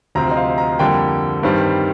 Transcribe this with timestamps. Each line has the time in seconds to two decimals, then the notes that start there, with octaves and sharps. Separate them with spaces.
0.15 D2 C3 F3 C4 A#5
0.31 D#5
0.37 F5
0.58 A#5
0.79 F2 D3 G3 A#3 G5
1.43 G2 D#3 G3 C4